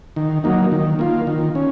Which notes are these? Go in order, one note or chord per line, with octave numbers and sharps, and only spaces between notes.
D#3
F#3 A#3 D#4
D#3
A#3 F4
D#3
C#4